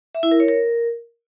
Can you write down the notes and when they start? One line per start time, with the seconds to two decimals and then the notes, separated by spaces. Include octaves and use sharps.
0.15 E5
0.23 E4
0.31 A#4
0.40 C#5
0.48 A#4